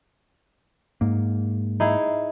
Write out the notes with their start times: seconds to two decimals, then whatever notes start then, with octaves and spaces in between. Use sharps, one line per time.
1.01 G#2 A#3
1.80 D#4 E4 G#4